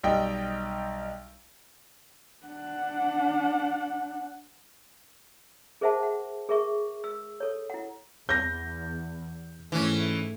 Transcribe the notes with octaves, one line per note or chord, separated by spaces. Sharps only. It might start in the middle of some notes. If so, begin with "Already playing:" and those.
B1 G3 D#5 G5
D4 F#5
G#4 A#4 C5 E5 F#5 A5
F#5
G#4 A#4 E5 C#6
E6
A4 C#5
E4 F#5
E2 G6 A#6
G#2 E3 A3 C#4